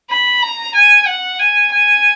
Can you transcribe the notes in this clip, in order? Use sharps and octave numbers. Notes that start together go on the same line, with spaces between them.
B5
A#5
G#5
F#5
G#5
G#5